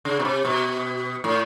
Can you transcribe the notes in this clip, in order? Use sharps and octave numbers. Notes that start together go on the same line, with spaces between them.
C#3
B2
C3
B2
A2